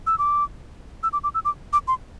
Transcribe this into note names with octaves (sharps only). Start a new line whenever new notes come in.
E6
D6
E6
D6
D6
E6
D6
D6
C6